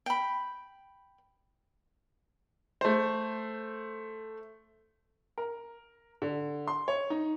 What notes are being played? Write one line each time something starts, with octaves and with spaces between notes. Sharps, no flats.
G5 B5
A3 C5
A#4
D3
C6
C#5
D#4